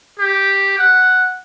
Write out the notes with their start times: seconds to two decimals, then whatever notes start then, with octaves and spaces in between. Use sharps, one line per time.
0.19 G4
0.78 F#5